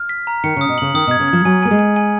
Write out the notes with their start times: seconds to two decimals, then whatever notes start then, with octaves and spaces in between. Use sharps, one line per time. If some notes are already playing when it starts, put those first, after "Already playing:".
Already playing: F6
0.09 B6
0.27 A#5
0.44 D#3 C#7
0.56 C#3
0.61 D#6
0.69 B2
0.78 C#3 F#7
0.94 D#3 D#6
1.07 B2
1.11 G#6
1.20 C#3
1.28 F3 G#6
1.45 F#3 G#5
1.63 A#3 G#5
1.71 G#3
1.79 G#5
1.96 G#5